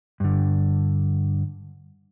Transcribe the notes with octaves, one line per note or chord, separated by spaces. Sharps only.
G2 D3